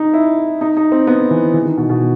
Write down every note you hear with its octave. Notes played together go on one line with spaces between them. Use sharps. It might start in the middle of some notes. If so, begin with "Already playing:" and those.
Already playing: D#4
E4
D#4
D#4
C4
B3
E3
E3
D#3
B2
B2